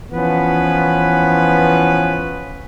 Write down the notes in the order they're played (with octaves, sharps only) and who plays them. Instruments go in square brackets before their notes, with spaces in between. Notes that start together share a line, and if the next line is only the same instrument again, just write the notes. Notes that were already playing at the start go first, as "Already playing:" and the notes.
[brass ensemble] E3 F3 B3 C#4 B4